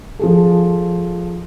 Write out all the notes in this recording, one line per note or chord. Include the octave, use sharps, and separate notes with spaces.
F3 G#4 A4